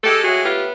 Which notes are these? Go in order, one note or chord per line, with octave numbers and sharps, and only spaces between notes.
G#3 G4 A4
A2 F#4 G#4
B3 F4 G4